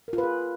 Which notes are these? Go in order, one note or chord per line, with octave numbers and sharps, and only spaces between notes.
A#4
F4
B4
G#4